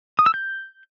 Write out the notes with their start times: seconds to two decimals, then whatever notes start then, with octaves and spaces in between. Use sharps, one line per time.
0.19 D#6
0.26 E6
0.34 G6